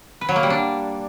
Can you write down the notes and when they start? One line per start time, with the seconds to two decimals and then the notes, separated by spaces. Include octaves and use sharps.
0.21 B4
0.29 F#3
0.36 A#3
0.43 G3
0.50 D4